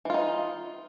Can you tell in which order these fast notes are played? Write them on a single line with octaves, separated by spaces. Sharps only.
E3 F4 D#4